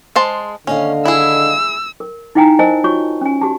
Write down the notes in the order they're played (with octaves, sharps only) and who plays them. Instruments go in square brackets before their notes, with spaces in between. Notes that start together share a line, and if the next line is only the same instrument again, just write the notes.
[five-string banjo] G#3 C5 A5
[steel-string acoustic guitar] D#2 D#5 F5 [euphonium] D3 [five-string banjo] C#4
[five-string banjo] E4 G#4 [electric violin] E6
[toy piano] A#4
D#4 E4 F5 G5 G#5 A#5
A#4 C5 D#5 G#5 A5
F4 F#4 C#5 C#6
C#4 G#5
F#4 G4 A5